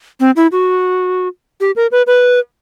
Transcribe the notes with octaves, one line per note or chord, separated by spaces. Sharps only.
C4
E4
F#4
G4
A#4
B4
B4